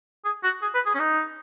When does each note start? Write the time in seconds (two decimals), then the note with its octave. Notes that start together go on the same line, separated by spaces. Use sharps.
0.25 G#4
0.43 F#4
0.62 G#4
0.75 B4
0.86 G#4
0.94 C#4
0.99 D#4